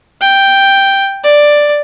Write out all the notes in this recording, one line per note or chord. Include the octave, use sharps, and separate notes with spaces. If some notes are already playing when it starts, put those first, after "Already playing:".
G5
D5